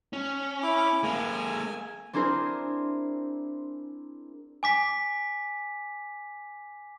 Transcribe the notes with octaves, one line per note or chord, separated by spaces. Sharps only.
C#4
E4 D6
G#3 A#3 G#5
C4 D4 E4 G#4 A#4 C5
G#5 D6 B6